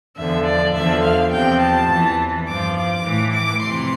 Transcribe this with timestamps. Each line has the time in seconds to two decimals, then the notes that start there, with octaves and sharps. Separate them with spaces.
0.16 E2 D3 F3 E5
0.46 D5
0.74 E2 D3 F3 E5
1.04 F5
1.31 E2 C3 F3 G5
1.60 A5
1.89 E2 E3
2.48 G2 F3 D6
2.76 D6
3.04 A2 E3
3.34 D6
3.62 F2 C3 E3 C6